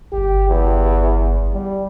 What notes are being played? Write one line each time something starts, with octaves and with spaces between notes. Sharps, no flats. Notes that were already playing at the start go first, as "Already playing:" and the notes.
G1 G4
E2
G3